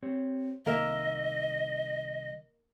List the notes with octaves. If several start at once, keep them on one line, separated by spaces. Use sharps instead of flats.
C4 G4 C#5
C2 D#3 A#3 A#4 D#5 E5